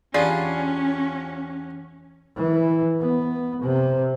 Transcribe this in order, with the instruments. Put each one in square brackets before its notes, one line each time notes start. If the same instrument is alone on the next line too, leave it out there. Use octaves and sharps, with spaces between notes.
[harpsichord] E2 D4 G4 [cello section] C#4 [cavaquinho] F4 G#4 B5 [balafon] D5
[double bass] E3
B3
C3